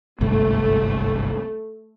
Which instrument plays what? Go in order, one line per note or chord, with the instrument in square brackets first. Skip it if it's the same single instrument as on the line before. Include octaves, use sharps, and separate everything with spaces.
[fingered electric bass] G1 C2 G#2 [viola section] A3